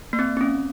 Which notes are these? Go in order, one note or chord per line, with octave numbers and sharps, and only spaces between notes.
A#3
C4
C4
C#4